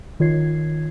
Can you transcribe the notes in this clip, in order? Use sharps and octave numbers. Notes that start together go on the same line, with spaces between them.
D#3 F4 C#5 G#6 C7